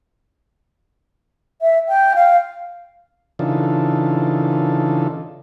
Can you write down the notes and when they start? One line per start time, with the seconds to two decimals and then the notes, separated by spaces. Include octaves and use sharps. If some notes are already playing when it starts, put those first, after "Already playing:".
1.62 E5
1.88 G5
2.16 F5
3.39 C#3 E3 D4 D#4 F4 A4